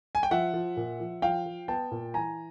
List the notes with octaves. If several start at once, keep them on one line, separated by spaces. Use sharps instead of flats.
G#5
G5
F3 E5 F#5
F3
A#2
F3
F3 F5 G5
F3
B3 G5 A5
A#2
E3 G#5 A#5